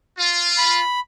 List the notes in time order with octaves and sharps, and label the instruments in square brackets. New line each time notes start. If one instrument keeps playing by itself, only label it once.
[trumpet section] F4
[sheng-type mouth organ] B5